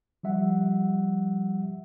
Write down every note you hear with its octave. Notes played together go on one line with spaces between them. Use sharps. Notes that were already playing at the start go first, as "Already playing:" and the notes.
F3 G3 E5 F#5